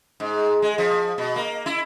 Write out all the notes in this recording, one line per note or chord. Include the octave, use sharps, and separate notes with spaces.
G#2
G#3
F3
B2
A#3
E4